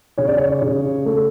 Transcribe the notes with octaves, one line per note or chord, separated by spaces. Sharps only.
C#3 C#5
D5
C#5
C#3
A3